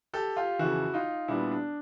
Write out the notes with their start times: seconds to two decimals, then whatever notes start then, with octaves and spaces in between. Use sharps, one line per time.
0.13 G4 A4
0.36 F4 G4
0.59 F2 C#3 E3 E4 F#4
0.94 D#4 F4
1.28 A#2 G3 B3 D4 E4
1.51 D4